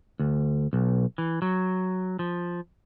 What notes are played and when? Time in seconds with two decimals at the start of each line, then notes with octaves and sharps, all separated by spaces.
0.19 D2
0.73 B1
1.18 E3
1.42 F#3
2.19 F3